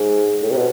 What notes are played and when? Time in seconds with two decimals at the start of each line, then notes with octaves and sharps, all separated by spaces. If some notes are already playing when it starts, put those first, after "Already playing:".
Already playing: G#2
0.42 A2
0.51 C3
0.57 B2